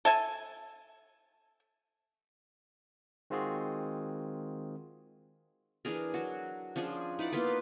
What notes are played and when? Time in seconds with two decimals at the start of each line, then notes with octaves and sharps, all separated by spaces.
0.05 A4 E5 G#5
3.30 D#3 G#3 C4 F4 F#4 G#4
5.85 E3 D4 G#4 A#4
6.14 F#3 F#4
6.76 F3 C#4 D4 G#4
7.19 D#4 E4 D5 F#5
7.32 A#3 B3 F4 B4